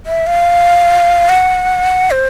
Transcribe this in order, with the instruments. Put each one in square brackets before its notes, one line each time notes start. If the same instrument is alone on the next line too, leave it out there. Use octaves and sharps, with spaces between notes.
[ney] E5
F5
F#5
C5